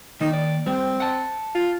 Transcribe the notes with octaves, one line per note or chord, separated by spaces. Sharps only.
D#3 A#3 D#4
D5
G3 C4
F#5 A5
F4